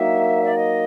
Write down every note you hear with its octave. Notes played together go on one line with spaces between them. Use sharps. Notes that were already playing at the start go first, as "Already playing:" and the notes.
Already playing: F#3 A#3 D#4 E5
D5
D#5